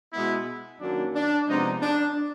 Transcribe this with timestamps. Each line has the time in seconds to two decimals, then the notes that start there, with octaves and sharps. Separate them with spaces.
0.13 B2 G#3 B3 E4
0.80 F#2 D#3 F#3 A#3 D4
1.14 D4
1.48 C3 F3 G#3 B3 D#4
1.82 D4